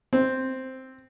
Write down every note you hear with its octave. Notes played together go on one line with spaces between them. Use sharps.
C4